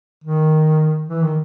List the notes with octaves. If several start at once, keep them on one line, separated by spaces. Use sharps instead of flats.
D#3
E3
D#3